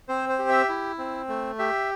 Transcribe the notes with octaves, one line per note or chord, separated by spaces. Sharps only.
C4 C5
C5
G4
E5
E4
C4
A3
G4 E5